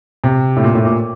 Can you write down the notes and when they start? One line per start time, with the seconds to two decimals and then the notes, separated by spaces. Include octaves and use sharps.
0.24 C3
0.56 A2
0.64 A#2
0.75 A2
0.85 A#2